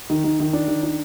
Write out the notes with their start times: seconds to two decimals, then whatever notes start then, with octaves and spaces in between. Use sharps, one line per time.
0.10 D#3
0.24 D#3
0.40 D#3
0.53 D4
0.68 D#3
0.83 D4